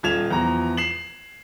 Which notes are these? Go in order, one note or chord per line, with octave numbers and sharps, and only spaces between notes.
D#1 F4 G#6 E7 F7
E2 F3 A#5
C7 E7 F#7